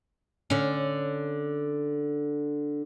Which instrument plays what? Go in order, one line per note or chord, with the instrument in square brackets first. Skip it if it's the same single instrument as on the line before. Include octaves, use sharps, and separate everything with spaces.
[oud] D3 C#4